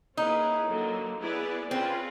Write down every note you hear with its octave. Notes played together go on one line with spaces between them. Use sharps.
A#3 C#4 D#4 E4 G#4 B4
D3 F#3 A#3
B3 E4 G#4 B4 D5
C4 C#4 F4 G#4 B4 D5